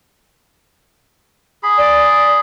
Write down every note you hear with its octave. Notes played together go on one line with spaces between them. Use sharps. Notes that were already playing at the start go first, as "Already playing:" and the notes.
G#4 B5
D5